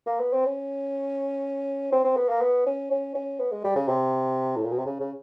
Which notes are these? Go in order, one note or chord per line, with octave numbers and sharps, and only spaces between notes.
A#3
B3
C4
C#4
C4
C4
B3
A#3
B3
C#4
C#4
C#4
B3
G#3
G3
C#3
C3
A2
A#2
B2
C3
C#3
C#3